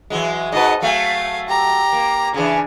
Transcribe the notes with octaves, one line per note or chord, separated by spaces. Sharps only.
E3 F#3 G#3
G#2 F#4 B4 D#5 A5
F#3 A3 F5 G#5
G4 A#5
A#3
C#3 E3 D4 G#4